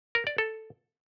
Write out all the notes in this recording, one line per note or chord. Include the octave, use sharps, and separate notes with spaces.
A#4
D5
A4